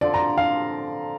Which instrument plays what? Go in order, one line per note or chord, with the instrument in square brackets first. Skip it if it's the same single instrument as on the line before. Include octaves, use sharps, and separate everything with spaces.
[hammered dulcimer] D3 F3 C4 F4 [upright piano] D5
[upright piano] A#5
F5